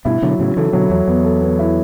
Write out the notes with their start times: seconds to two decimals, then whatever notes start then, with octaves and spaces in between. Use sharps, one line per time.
0.05 G2 B2 E4
0.22 B2 D3 F#3
0.39 A2 C#3 F#3
0.56 C#3 E3 A4
0.73 B2 D3 F#3
0.90 E2 F#3
1.07 E2 B3
1.25 A4
1.41 B3
1.59 E4